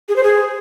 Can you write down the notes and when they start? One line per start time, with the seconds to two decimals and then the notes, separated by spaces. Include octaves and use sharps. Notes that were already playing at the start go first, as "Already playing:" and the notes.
0.09 G#4
0.16 C5
0.24 G#4